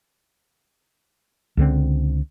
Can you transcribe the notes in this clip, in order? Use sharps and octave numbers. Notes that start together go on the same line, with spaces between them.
C#2 D3 C4